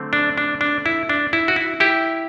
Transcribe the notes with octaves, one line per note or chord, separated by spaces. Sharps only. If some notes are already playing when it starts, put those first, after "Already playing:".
Already playing: D3 F#3 A3 C4
D4
D4
D4
E4
D4
E4
F#4
E4
E4 G4